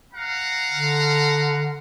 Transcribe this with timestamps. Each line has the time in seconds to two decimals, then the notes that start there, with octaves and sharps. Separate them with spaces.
0.14 F5 F#5 A#5
0.72 D3